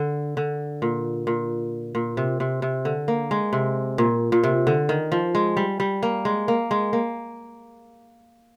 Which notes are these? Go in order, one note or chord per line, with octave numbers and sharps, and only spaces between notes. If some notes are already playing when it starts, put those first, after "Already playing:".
Already playing: D3
D3
A#2
A#2
A#2
C3
C3
C3
D3
A#3
G#3
C3
A#2
A#2
C3
D3
D#3
F3
G#3
G3
G3
A#3
G#3
A#3
G#3
A#3